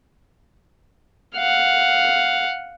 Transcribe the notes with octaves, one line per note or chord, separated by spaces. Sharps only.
F5 F#5